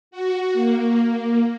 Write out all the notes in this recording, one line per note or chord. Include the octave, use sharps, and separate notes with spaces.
F#4
A#3